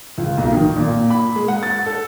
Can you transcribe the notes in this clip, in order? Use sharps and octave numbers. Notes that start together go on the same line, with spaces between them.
C#2
B1
D#3
A#2
B5
G#3
F#5
A6
A4